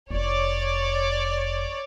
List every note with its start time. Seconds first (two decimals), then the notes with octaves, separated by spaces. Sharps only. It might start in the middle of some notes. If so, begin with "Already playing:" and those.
0.11 F1 E4 C#5 D5